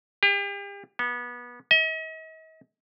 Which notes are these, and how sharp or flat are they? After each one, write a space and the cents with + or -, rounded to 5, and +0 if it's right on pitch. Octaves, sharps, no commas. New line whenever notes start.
G4 +40
B3 -25
D#5 +45